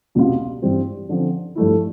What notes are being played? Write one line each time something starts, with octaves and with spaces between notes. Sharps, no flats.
C2 B2 B3 F4
G2 E3 G3 C4
D3 F3 C4
G2 F3 A3 E4